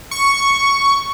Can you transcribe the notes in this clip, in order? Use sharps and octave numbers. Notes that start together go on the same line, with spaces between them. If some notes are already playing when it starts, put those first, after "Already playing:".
C#6